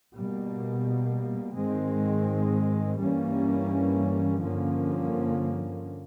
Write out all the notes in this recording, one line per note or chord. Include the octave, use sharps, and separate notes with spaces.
B2 G3 A#3
G#2 D#3 G#3 C4
G2 E3 G3 A#3 C#4
G2 D3 F3 A#3 C#4